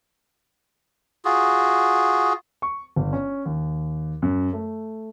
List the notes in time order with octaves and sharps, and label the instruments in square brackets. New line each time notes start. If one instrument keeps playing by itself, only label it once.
[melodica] F4 F#4 G#4
[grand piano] C#6
G1
C#4
D#2
F#2
A3